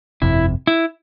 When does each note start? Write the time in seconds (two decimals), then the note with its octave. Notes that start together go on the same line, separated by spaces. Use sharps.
0.22 G1 F2 C3 E4
0.67 E4